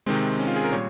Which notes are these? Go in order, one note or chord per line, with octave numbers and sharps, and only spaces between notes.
C3 D#3 G#3 C4
C#4
F4
G#4
A#4
A#2 G3 C#5